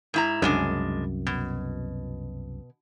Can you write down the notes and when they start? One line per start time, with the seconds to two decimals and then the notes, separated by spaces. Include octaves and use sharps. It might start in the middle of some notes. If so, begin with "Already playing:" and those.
0.14 G#2 E4 A#5
0.42 C2 F#2 C#3 G#3 D4
1.27 B2